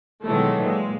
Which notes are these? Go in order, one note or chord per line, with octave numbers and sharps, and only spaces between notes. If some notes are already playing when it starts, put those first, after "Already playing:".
B2 D#3 E3 F#3 G#3 A3
A#2 G#3